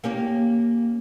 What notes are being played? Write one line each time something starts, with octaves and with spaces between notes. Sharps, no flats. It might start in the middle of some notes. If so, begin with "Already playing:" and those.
A#3 C#4 G4